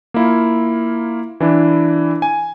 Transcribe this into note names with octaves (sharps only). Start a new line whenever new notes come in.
A#3 E4 F4
E3 D4 E4
G#5